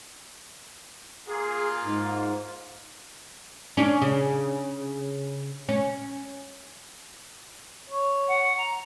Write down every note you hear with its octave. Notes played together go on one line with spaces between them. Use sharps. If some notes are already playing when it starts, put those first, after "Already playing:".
A#3 F4 G#4
G#2
C#4 D4
C#3
C#4
C#5
F#5
A#5